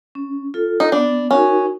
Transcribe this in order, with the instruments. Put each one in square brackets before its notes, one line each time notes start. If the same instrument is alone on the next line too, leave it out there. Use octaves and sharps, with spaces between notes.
[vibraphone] C#4
F4 A4
[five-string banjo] D#4
[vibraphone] B3 [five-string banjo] D4
[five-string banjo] C#4 [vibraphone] D#4 F#4 A#4